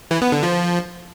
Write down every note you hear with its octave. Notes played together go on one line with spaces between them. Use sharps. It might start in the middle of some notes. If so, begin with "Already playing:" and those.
E3
B3
D3
F3